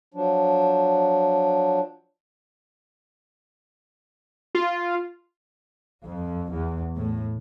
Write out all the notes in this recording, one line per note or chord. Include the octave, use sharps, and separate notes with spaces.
F3 F#3 D4
F4
F2
E2
A2